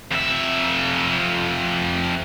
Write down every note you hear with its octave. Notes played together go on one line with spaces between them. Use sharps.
F2 E5